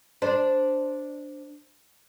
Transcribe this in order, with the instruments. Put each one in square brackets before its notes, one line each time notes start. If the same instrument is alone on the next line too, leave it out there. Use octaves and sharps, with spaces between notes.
[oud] D4 C5